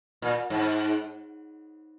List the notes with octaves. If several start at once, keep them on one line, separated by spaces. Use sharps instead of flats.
A#2
G#2